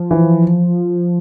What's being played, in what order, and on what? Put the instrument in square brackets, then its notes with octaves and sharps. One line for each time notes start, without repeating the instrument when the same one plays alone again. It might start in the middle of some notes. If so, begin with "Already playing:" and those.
Already playing: [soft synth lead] F3
[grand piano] E3